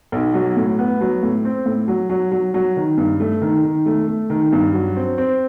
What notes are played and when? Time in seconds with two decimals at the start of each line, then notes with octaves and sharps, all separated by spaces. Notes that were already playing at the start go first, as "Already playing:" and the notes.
0.12 B1
0.34 F#3
0.56 A2
0.79 B3
1.01 F#3
1.23 A2
1.45 C4
1.66 A2
1.88 F#3
2.10 F#3
2.32 F#3
2.54 F#3
2.76 D#3
2.97 G2
3.20 A3
3.41 D#3
3.64 D#3
3.86 A3
4.07 A3
4.30 D#3
4.52 G2
4.73 F#3
4.96 C4
5.18 C4